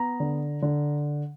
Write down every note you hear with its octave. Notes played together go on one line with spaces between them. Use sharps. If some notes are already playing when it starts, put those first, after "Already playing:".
Already playing: B3 A#5
D3
D3